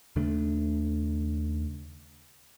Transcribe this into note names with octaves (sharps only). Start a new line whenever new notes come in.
D#2 C#3 A3 D4